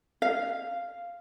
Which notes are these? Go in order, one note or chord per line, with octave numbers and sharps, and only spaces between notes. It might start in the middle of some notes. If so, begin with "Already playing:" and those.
F5